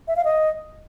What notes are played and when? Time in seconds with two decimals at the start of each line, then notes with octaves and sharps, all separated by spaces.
0.08 E5
0.16 F5
0.25 D#5